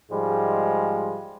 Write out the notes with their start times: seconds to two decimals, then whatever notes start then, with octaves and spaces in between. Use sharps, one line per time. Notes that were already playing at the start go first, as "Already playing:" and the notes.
0.11 G#2 F3 G3 G#3